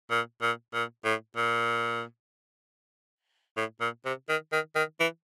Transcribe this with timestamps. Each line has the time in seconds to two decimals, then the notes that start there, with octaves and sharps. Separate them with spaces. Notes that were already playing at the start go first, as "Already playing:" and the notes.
0.10 A#2
0.41 A#2
0.74 A#2
1.05 A2
1.37 A#2
3.57 A2
3.81 A#2
4.05 C3
4.29 D#3
4.52 D#3
4.75 D#3
5.00 E3